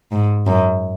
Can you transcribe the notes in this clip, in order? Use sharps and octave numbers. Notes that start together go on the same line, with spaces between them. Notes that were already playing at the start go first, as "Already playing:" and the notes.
G#2
F#2